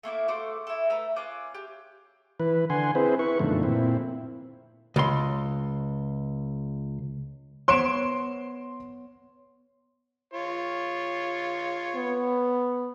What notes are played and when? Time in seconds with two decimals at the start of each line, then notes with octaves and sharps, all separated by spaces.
0.03 A3 A#3 E4 D6
0.28 A3 F#4 C5 D6
0.67 E4 A4
0.90 A3 B4 A#5 E6
1.16 C#4 F4 D6 F#6
1.54 G4
2.40 E3 B4
2.70 D3 F#5 G#5 C6
2.95 C4 E4 G#4 B4 C5
3.19 E4 B4 C#6
3.39 F#2 B2 D3 D#3 F3 A3
3.63 A#2 C4 E4
4.96 C#2 C6
7.68 B3 C#5 C6 D7 E7
10.34 F4 C#5
11.96 B3